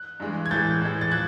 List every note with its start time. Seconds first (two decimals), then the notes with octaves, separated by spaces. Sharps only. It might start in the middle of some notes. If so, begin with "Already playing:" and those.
Already playing: F#6
0.20 G2 E3 G#3
0.46 G#6
0.51 A2 E3 G#3 G6 A6
0.81 A2 E3 G#3
1.01 A6
1.11 F3 F#6 G#6